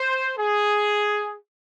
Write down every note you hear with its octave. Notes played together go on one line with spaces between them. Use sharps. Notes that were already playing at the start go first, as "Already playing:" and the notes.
Already playing: C5
G#4